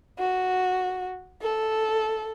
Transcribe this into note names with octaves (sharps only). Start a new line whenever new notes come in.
F#4
A4